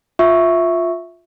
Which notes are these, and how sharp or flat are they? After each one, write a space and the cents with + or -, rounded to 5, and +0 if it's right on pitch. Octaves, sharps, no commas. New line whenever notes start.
F4 +10 E5 +0 C#6 +0